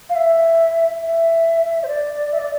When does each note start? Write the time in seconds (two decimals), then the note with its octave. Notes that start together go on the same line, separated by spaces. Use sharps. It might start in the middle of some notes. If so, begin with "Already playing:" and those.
0.10 F5
0.16 E5
1.03 E5
1.84 C5
1.88 D5
2.32 E5
2.39 D5